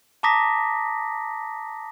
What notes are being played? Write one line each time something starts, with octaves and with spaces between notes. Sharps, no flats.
A5 A#5 D6 D#6 A#6 B6